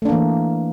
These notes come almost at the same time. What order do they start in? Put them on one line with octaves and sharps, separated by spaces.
A3 D4 A#3 E3